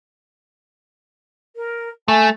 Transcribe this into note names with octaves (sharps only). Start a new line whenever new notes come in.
A#4
A3 G#5